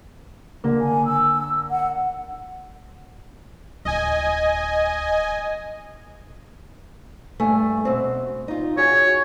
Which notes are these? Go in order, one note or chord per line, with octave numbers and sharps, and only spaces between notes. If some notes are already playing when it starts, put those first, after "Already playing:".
D3 A#3
G#5
E6
F#5
D1 D#5 G#5
G2 A3 G#5
B2 C4
D#4 F4
F#4 G#4 C#5